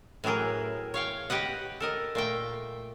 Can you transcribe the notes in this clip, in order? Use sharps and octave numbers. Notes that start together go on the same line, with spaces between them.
A2 E3 F#3 G#4 A#4
C#5 F5 G5
G4 B4 D#5 F#5
A4 A#4 D#5
A#2 A3 G5